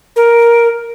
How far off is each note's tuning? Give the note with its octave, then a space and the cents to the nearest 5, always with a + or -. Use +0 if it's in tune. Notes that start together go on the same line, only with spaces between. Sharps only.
A#4 +10